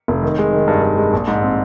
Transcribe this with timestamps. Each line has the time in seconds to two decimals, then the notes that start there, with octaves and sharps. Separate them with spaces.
0.08 F1
0.22 D#3
0.38 G#3
0.53 D#3
0.68 G2
0.83 G2
0.98 G#3
1.13 A#1
1.28 G#2
1.43 C4